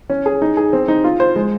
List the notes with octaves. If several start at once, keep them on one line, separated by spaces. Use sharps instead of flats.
C#4
G#4
D#4
G#4
C4
D#4
F4
C5
G#3